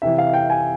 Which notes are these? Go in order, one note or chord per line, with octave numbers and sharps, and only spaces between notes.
C3 E3 E5
F5
G5
G#5